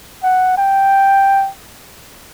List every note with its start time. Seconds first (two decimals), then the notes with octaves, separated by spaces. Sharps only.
0.23 F#5
0.58 G5